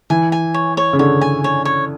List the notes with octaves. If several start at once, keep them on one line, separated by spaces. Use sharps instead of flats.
E3 G#5
G#5
C#5
C#5
C#3
D3 C#5
G#5
C#5
C#5